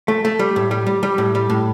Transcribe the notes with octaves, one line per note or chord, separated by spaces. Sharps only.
A3
A3
G3
A2
G3
G3
G3
A2
G3
A2